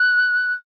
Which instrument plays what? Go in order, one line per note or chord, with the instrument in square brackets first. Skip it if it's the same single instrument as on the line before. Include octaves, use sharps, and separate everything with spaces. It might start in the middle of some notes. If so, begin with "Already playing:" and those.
Already playing: [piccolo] F#6